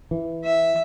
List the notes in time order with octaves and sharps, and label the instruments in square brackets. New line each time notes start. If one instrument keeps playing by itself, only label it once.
[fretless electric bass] E3
[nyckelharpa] E5